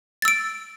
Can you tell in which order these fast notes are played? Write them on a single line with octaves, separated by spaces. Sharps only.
A6 E6 D7